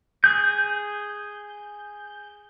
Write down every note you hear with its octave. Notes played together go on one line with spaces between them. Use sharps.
G#4 G6